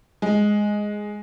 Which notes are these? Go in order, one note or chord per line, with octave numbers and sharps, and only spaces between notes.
G#3